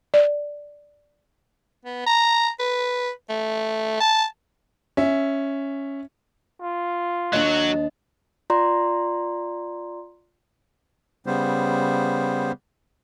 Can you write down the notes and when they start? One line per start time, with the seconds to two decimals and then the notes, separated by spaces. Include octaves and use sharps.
0.14 D5
1.85 B3
2.06 A#5
2.59 B4
3.29 A3
4.00 A5
4.97 C#4 E5
6.61 F4
7.33 D#2 F#3 D4 F#4 D#5
8.50 F4 D5 A#5 C6
11.27 C#3 G3 B3 C5